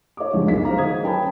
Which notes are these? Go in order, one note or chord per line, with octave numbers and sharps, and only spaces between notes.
C#5 D6
C#2 G2 F3 F#3 G#3
B1 F#2 G#4 B6
C5 F5 A#5
D#3 F#3 D#5 D#6 G#6
C#4 B4 G5 A5 B5